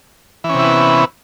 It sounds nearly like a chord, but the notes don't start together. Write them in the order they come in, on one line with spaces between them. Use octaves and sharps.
E3 C#4 C3 E4 B3